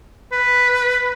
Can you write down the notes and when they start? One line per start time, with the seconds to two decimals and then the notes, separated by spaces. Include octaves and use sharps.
0.32 B4